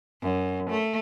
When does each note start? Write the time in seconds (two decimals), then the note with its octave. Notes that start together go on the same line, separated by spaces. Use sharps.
0.22 F#2
0.70 A3